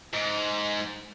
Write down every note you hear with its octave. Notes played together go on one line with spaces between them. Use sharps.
G#2